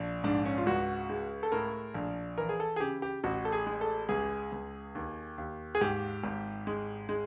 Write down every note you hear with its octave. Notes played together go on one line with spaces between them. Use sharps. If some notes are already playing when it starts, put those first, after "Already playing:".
Already playing: A#1
G#2 D4
C#4
F4
C#2 F#4
G#3
A4
A2 A#4
A#1
E3 A#4
G#4
A4
G#4
C#3 G4
G4
A1 F#4
A4
G#4
G#3
A4
C#2 G#4
C#2
D#2
D#2
G#4
G#2 G4
G#1
G#3
G#3